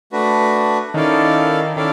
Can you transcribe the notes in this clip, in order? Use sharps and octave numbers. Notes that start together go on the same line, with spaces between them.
A3 D4 F#4 B4
D#3 C#4 E4 A4 D5 F5
D#3 C#4 E4 A4 D5 F5